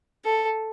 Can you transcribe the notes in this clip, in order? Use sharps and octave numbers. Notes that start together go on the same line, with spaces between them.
A4